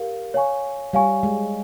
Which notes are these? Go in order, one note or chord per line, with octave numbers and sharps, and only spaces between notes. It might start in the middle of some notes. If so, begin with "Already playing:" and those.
Already playing: G4 A#4 F5
C#5 F5 G#5 C#6
G3 C#5 F5 G#5 C#6
G#3